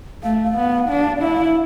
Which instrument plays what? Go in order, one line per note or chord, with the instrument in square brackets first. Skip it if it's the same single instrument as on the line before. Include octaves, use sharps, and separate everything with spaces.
[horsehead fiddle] A3 [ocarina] F5
[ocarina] F5
[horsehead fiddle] B3
D4
[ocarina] D5
[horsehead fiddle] E4 [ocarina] E5
[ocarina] F5
E5